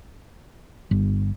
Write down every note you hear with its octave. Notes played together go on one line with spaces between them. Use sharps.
G1